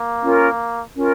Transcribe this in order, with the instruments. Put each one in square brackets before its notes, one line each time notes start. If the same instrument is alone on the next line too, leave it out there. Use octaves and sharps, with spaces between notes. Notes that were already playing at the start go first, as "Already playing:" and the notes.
Already playing: [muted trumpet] A#3
[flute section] C#4 F4 A#4
C#4 F4 A#4